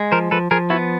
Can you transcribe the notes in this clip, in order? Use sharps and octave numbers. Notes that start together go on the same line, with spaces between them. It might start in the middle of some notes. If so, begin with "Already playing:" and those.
Already playing: G#3
F3 A#4 C5
F3 A4 B4
F3 G#4 A#4
B3 E4 F#4